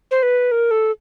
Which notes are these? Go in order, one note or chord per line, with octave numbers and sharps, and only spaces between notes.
C5
B4
A#4
A4